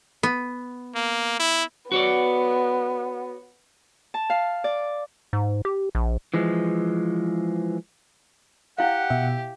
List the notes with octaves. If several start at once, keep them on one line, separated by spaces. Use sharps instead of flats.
B3
A#3
E4
B3 F#4 C#5 D5
A5
F5
D5
G#2
G4
A#1
E3 F3 G#3
E4 G4 F5 F#5
B2 E5